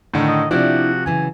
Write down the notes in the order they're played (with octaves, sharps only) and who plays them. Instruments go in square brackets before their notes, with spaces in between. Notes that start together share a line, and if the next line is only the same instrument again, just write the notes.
[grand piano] A2 D3 D#3
[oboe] D#5
[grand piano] C3 F3 [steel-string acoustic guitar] D4 E4 D5 [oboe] F#4
[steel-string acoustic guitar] C#3 E3 F#3 [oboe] G#5